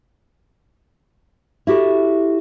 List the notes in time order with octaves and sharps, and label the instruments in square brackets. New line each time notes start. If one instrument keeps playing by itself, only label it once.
[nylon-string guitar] E4 F#4 G4 A4